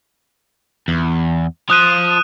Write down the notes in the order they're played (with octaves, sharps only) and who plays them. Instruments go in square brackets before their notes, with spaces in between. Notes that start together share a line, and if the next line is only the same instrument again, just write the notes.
[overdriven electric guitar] E2
[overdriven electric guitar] F3 [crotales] D#6 F#6 D#7